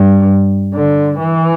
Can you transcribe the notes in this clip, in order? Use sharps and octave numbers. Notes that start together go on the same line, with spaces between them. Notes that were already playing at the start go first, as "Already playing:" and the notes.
Already playing: G2
D3
E3